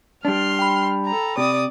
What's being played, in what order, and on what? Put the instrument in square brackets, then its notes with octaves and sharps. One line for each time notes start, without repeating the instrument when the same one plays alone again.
[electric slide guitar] G3 D4 [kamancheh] C6 F6
[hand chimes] G5 B5
[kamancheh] A4 A#5
[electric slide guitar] C3 [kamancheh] D5 D#6